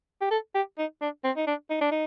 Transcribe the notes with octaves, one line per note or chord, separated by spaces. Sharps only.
G4
A4
G4
D#4
D4
C4
D#4
D4
D#4
D4
D#4